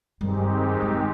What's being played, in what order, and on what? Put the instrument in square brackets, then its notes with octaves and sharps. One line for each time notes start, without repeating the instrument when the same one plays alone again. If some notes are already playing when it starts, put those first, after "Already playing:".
[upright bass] G2 [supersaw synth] D#3 G#3 C4 D#4 G4
[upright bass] G#2